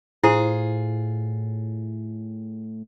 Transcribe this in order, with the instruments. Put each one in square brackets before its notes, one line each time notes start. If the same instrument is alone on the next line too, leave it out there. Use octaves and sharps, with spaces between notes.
[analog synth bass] A2 [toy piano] E4 C5 [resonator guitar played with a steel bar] F4 G#4